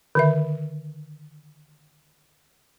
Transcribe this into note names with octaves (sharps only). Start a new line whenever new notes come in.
D3 D#3 E5